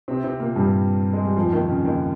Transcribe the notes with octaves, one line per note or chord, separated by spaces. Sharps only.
C3 C4
C3 C4
A#2 A#3
G2 G3
G#3
G3
F2 F3
D#2 D#3
C#3
D#2 D#3